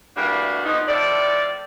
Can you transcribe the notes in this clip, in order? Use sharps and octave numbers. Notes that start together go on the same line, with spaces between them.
E3 G3 A3 A#3 D4 F#4
B2 D3 F3 B3 D#4
A2 F3 A4 D5